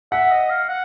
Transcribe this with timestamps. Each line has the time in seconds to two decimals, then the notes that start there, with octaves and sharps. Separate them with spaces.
0.12 E5 F#5
0.31 D#5
0.50 F5
0.68 F#5